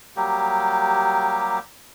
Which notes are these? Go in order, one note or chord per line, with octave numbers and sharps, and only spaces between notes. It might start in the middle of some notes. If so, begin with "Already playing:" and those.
F#3 G3 A#3 G4